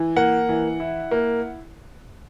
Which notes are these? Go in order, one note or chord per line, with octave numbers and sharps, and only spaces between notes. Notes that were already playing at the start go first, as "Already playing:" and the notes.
Already playing: E3
A#3 F#5
E3
E4
A#3